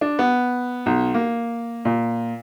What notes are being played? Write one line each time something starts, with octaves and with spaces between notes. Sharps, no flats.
D4
B3
B1
A#3
A#2